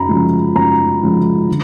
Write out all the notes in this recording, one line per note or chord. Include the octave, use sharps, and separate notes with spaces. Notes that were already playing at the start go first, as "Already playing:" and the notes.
Already playing: F#2 A#5 B5
C#3 F3 G#3
F#2 A#5
C#3 F3 G#3
D3